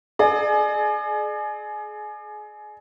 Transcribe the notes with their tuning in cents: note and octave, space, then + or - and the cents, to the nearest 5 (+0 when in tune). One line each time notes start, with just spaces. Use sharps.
G#4 +30 D5 +40